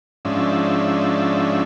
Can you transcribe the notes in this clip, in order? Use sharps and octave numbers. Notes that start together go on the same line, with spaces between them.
G#2 F3 C#4 D4 E5